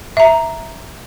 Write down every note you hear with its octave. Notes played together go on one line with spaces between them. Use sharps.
E5 A#5